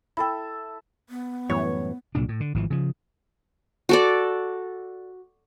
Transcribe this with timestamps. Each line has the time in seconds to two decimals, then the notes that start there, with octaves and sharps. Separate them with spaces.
0.17 E4 A4 E5 G5 B5
1.09 B3
1.50 F#2 A2 E3 G3 C#5
2.15 C2 A#2 F#3 D4
2.29 A2
2.40 D3
2.54 G#1 E3 F3
2.70 C#3 F3
3.89 F#4 A4 D5